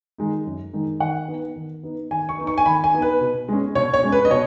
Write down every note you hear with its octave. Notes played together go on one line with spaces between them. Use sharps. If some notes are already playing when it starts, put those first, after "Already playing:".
D#3 G#3 D#4
F#2
D#3 G#3 D#4
D#3 F#5
B3 D#4
D#3
B3 D#4
D#3 G#5
C#6
B3 D#4
C#6
G#5
D#3 B5
G#5
B3 D#4
B4
B2
G#3 C#4
B2 C#5
C#5
G#3 C#4
B4
D#5
B2 C#5